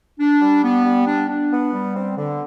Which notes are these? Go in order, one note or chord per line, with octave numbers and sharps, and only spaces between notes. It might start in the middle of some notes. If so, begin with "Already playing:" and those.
D4
G3
B3
G3
D4
D4
B3
G3
C4
D3